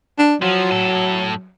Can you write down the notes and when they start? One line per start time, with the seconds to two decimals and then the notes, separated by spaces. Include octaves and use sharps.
0.18 D4
0.42 F3 F#3
0.71 A2 A4